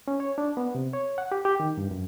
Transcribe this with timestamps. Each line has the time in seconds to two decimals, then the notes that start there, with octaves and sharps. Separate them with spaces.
0.08 C#4
0.20 C#5
0.38 D4
0.57 B3
0.75 C3
0.93 C#5
1.18 F#5
1.32 G4
1.45 G4
1.60 D#3
1.78 G2
1.91 F#2